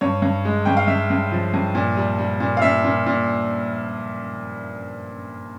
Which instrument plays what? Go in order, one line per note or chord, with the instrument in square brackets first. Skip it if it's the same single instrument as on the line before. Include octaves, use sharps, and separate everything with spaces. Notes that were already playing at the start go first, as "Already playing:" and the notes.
[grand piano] G2 C#5
G2
G#3
G2 G5
F5
G2 E5
G2
F3
G2
A#2
G3
G3
A#2
F5
A#2 E5
A#2
A#2